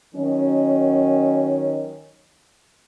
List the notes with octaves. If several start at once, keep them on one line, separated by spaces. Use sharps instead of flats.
D#3 F#3 C#4